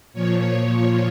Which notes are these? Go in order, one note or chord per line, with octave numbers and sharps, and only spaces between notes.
A#2 F3 C#5